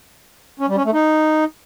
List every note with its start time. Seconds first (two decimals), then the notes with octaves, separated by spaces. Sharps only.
0.60 C#4
0.68 G3
0.77 C#4
0.85 A3
0.93 D#4